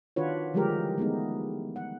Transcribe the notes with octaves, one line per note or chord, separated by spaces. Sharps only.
D#3 D4 F4 F#4 B4 C#5
D3 F3 G3 G#3 G4 A#4
E3
G#3 A3 B3 D#4
F#5